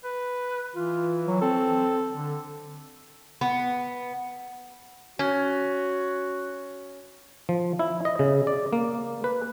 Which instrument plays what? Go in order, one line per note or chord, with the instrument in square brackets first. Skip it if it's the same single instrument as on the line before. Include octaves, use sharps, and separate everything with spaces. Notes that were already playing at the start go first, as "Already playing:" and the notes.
[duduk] B4
[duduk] E3 [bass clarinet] F4
[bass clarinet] F#3
[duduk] C4 [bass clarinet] A4
[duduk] D3
[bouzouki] B3
[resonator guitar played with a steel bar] C#4 [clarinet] F#4
[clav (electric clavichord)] F3
E4
D#5
C#3
D5
A#3
B4